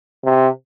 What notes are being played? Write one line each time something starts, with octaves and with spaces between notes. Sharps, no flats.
C3